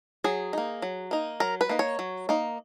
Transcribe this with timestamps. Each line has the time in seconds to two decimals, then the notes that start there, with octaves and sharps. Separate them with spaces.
0.24 F#3 G#4
0.53 A#3 D#4
0.82 F#3
1.11 A#3 D#4
1.40 F#3 A#4
1.61 B4
1.69 A#3 D#4
1.79 C#5
1.99 F#3
2.29 A#3 D#4